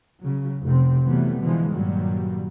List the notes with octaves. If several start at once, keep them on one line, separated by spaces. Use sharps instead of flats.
C#3 F#3
F1 C3 C4
C3 E3 F#3 G3 A3 B3
B2 D3 E3 F3 G#3
G2 A#2 D#3 F#3 G3